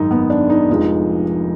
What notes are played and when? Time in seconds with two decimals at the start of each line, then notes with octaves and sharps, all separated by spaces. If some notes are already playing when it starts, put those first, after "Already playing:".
Already playing: G#1 F#2 D#3 G#3 D#4
0.11 B3
0.30 D4
0.50 D#4
0.69 F1 F2 F3 G#3